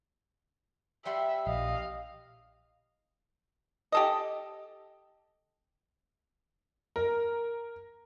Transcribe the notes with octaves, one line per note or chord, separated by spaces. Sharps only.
G3 E5 F#5 C6
A#1 D#5 F5
G4 A4 D#5
A#4